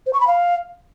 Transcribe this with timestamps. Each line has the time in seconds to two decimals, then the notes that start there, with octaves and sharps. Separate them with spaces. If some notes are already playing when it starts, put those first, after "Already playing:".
0.06 C5
0.13 C#6
0.20 B5
0.27 F5